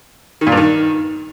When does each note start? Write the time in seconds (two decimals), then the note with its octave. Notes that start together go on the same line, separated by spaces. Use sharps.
0.41 D#3
0.47 A#2
0.52 G2
0.57 D#3